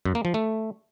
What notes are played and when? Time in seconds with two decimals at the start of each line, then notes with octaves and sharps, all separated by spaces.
0.05 F#2
0.15 A#3
0.25 F3
0.34 A3